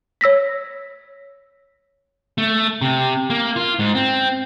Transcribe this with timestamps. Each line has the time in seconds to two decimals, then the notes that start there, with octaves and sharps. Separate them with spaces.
0.21 C#5 E6 A#6 B6
2.38 A3
2.82 C3
3.30 A#3
3.56 F4
3.79 G#2
3.95 C4